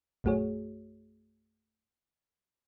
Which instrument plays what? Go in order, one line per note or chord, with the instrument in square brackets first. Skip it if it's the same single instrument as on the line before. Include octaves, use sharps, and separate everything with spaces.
[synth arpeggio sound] A#1 F#2 A3 F#4 G#4 C#5